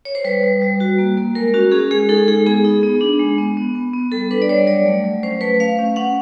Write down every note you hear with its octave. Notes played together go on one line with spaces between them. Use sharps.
C#5
C5
G3 B4
G3
G3
F#4
A#3
A#3
G#3 A#4
C#4 F#4
C#4 G#4
G#3 G#4
D#4 A4
G#3 G#4
B3 G#4
D#4
B3
D4
G#3
B3
B3
B3
B3
G3 A4
D4 B4
D5
G3 C#5
F#3 D5
A3
F#3
C#4 C5
A3 B4
A3 F5
C#4
C#4 F#5